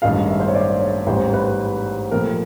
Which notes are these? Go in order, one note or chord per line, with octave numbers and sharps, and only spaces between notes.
A1 G2 D#3 G#3 F5
E5
C5
C#5
D5
C#5
A1 G#2 E3 G3 C5
B4
A#2 F3 A3 C4 A#4